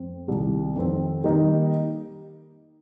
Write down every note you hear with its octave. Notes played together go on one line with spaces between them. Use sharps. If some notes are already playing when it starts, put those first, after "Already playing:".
Already playing: F2 C4
C2 C3 D#3 G3
F2 D#3 C4
D#3 G3 A#3 D#4